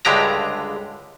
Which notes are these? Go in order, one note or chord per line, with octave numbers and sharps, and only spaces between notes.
C#2 G2 D3 G#3 G4 A#5